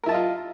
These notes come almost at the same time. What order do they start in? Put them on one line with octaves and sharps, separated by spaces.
A#4 E4 A5 D#5 F4